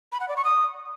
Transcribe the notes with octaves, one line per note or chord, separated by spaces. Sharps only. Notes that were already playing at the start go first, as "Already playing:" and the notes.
B5
F#5
D5
C#6
D#6